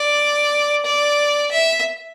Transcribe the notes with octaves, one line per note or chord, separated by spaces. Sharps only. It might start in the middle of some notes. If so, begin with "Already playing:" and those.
Already playing: D5
D5
E5